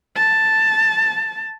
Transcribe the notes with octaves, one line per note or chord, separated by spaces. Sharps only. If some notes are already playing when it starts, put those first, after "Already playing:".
A5